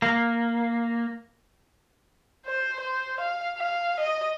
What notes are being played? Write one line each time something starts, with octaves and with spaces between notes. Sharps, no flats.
A#3
C5
C5
F5
F5
D#5